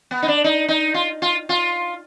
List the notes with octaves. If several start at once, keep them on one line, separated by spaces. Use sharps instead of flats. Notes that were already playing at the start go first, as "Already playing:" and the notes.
B3
D#4
D4
D#4
D#4
F4
F4
F4